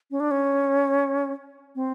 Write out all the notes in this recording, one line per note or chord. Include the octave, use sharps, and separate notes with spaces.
C#4
D4
C#4
C4